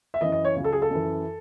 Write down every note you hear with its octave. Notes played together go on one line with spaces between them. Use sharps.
E5
F#2 E3 D#5
D#5
C#5
C#2 C#3 F#3
A4
G#4
A4
F#2 E3